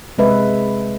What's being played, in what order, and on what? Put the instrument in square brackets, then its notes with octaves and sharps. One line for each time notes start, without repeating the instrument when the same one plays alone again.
[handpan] C3 G#3 B4 E5